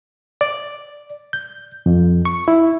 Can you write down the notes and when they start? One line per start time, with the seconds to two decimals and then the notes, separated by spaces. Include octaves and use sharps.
0.41 D5
1.33 G6
1.86 F2
2.25 C#6
2.48 E4